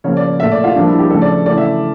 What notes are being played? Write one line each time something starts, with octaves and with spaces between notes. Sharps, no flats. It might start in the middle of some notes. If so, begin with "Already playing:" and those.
C#3 F3 A#3 C#5
D5
A#2 A3 E5
D5
F4
G2 F3 A#3 D4
E4
G4
C#3 F3 A3 A4
D5
C#3 E3 A3 D5
E5